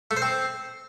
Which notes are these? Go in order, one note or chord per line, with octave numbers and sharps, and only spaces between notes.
A3
C5
C4